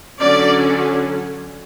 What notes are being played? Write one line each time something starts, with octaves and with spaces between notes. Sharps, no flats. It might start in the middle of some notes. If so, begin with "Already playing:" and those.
D3 F#3 C#4 D5